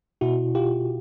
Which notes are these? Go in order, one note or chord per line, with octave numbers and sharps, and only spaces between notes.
B2 E4 F#4
F4 G4